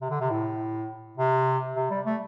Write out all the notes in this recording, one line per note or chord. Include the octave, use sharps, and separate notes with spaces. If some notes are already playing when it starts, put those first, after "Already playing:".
C3
D3
C3
A2
C3
C3
G3
A3